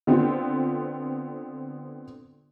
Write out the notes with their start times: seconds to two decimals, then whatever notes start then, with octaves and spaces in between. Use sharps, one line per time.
0.07 D3 B3 C4 F4